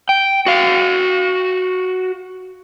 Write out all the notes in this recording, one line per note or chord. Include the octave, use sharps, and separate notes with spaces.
G5
F#4 F5